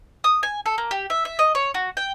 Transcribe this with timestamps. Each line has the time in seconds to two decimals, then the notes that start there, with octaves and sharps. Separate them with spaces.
0.24 D#6
0.43 G#5
0.66 A4
0.78 A#3
0.91 G4
1.10 E5
1.25 E5
1.39 D#5
1.55 C#5
1.74 F#4
1.97 G5